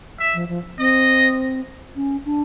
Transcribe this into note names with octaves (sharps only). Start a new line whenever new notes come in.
E5
F3
F3
C4 D#5
C#4
D4